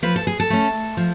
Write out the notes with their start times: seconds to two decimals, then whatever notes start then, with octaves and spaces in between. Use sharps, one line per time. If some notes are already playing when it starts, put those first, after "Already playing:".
0.03 F3 B4
0.16 A4
0.27 G#4
0.40 A4
0.50 A3 C#4
0.97 F3